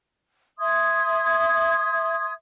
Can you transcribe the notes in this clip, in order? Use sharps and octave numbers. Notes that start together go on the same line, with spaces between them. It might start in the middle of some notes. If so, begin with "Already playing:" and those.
E5 C6 D#6 G#6